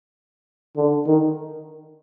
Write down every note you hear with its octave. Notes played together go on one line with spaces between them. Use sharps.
D3
D#3